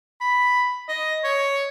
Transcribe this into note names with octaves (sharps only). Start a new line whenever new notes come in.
B5
D#5
C#5